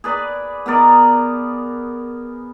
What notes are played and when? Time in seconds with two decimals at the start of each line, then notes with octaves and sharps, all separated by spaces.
0.04 G#4 B4 D5
0.66 B3 G#4 A#4 D5